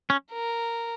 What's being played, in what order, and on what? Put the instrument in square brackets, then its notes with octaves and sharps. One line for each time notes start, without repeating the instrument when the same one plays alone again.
[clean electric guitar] C#4
[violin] A#4